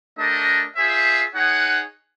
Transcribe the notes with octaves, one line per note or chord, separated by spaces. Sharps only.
A3 D4 G4 A#4 D#5
F4 G#4 C5 E5
D#4 G#4 C#5 F#5